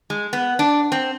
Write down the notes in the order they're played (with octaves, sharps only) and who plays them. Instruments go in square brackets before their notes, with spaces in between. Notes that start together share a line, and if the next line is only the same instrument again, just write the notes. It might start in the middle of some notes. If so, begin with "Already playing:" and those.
[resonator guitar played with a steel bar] G#3
B3
D4
C4